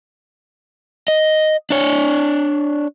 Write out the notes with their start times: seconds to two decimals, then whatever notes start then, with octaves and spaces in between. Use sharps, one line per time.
1.08 D#5
1.70 D4 C#5